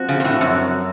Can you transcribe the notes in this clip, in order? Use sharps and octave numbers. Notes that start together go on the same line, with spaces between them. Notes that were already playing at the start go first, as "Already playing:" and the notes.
Already playing: F3 C4 F#4
C#3
A#2
A2
F#2